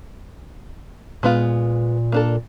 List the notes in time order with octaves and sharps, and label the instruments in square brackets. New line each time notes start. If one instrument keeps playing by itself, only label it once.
[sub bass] A#2 [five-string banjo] G#3 B3 F4
[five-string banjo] A#3 D4 A4